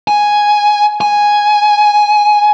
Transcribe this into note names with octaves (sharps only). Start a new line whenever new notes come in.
G#5
G#5